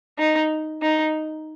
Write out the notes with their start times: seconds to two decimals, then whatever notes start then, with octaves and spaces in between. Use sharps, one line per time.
0.19 D#4
0.82 D#4